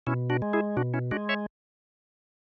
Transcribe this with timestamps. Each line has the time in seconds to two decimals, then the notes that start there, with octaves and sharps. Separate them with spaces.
0.07 B2 C#4 E4
0.30 D4 F#4
0.42 G#3
0.53 E4 G#4
0.77 B2 D4 F#4
0.94 C#4 E4
1.11 G#3 D4 F#4
1.29 C#5 E5